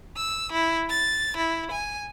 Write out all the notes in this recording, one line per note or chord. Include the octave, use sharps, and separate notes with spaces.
E6
E4
A6
E4
G#5